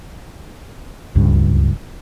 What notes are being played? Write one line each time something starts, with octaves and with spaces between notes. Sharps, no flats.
D1 C#2 G2